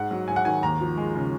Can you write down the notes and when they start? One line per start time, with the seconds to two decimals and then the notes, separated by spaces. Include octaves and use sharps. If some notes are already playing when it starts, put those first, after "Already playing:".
Already playing: G#2 F#5
0.11 F#3
0.28 G#2 G#5
0.36 F#5
0.45 D#3 G#5
0.63 D#2 A#5
0.81 F3
0.97 G#3
1.15 C#3